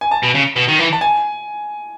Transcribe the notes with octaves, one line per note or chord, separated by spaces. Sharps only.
G#5
A5
B2
C#3
B2
D#3
E3
A5
G#5